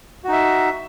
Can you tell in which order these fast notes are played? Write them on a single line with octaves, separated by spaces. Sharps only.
F#4 D#4 E5